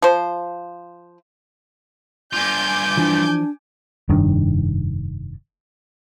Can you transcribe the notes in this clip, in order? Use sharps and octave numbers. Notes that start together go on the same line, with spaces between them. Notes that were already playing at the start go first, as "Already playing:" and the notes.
F3 C5
G2 F4 G#5 D6 G6
E3 F3 D4
F1 G2 D#3 D4